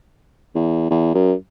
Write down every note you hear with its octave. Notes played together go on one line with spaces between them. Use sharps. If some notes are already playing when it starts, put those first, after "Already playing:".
E2
E2
F#2